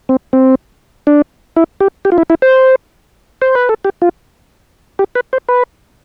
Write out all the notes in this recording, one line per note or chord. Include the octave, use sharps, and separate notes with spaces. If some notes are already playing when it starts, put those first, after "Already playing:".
C4
C4
D4
E4
G4
G4
F4
E4
E4
C5
C5
B4
A4
G4
F4
G4
B4
C5
B4